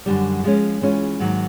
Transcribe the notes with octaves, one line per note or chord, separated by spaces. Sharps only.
F#2 D3 G3
F3 G#3 C#4
E3 G#3 C#4 F4
G#2 D#3 F#3 A#3